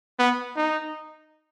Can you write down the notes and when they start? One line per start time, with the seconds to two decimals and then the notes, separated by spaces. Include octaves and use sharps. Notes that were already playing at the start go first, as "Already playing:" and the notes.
0.19 B3
0.56 D#4